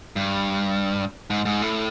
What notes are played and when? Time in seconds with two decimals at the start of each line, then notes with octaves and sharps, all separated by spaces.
0.16 G2
1.30 G#2
1.45 G#2
1.62 A2